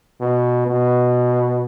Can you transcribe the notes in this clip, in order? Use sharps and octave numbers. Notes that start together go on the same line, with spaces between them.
B2
B2